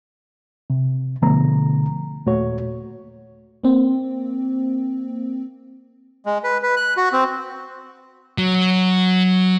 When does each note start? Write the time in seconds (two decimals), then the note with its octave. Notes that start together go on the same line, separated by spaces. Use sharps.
0.70 C3
1.22 B2 D3 F3 A3 B3 A#5
2.26 D#2 A#2 A3 F#4 C#5
3.64 A#3 C4
6.26 G#3
6.44 B4
6.63 B4
6.77 F#6
6.97 F#4
7.13 C4
8.38 F#3